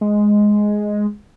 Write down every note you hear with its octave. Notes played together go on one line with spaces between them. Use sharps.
G#3